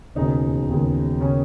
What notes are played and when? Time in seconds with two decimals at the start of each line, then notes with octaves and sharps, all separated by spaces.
0.15 E1 D#2 C#3 D#4
0.68 E1 D#2 C#3
1.20 C#3 C#4